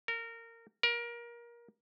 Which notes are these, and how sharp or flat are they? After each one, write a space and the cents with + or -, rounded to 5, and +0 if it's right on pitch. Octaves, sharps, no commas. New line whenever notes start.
A#4 -20
A#4 +25